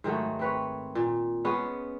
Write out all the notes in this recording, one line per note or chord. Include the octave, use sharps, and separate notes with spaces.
G#2 D#3 F#3 A3
C4 B4 C#5
A#2
G#3 B3 C#4 B4